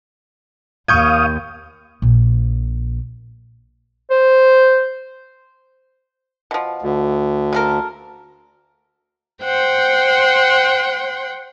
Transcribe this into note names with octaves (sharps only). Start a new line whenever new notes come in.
D#2 F5 C#6 D#6 G6 G#6
A#1 A#2
C5
B2 F3
D2
C#3 A4 A#4
C5 F#5 G5 C6